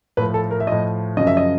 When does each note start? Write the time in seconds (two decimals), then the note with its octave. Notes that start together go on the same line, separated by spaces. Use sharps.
0.17 A2 F3 B4
0.34 A4
0.51 A#4
0.60 E5
0.67 A2 F3 D#5
1.17 F#2 C#3 F3 D#5
1.27 E5
1.37 D#5